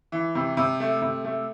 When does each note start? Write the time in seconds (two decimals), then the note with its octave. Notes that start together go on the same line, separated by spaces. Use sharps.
0.12 E3
0.35 C3
0.57 C3
0.80 A3
1.02 C3
1.24 A3